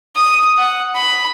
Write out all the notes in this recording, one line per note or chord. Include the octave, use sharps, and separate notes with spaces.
D#6
F#5
B5